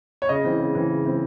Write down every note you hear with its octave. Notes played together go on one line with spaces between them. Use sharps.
C#5
C#3 D#5
E3 C4
C#3
E3 C4
C#3
E3 C4